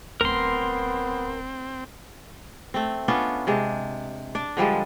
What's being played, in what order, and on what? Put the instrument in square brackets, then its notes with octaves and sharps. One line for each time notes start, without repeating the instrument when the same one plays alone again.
[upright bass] D1 [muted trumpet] B3 [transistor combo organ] C4 [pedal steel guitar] A#4 C6
[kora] A3 C4
B3 C#4 D4 F4
C3 G#3 D4
D4 D5
D3 F3 G3 G#3